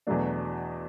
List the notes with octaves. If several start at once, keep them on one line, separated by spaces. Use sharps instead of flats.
E2 B2 F#3 A3 D4